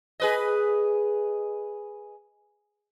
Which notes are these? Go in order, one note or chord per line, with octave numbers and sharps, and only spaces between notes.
G#4 B4 D#5